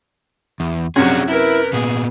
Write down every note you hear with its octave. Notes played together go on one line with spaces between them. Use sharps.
E2
F#2 C3 C#4 D4 F#4 G#4
E4 A#4 B4
A#2 B3 G#4